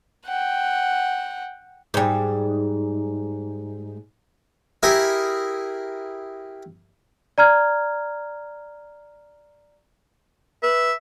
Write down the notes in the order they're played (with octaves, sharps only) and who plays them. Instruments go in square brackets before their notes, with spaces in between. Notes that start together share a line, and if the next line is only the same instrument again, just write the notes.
[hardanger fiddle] F#5 G5
[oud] G#2 G3
[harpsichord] E4 G4 G#4 A#4
[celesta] D5 A#5 F6 G#6
[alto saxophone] B4 [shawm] E5